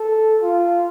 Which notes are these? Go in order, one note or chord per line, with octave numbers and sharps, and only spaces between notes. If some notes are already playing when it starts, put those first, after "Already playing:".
Already playing: A4
F4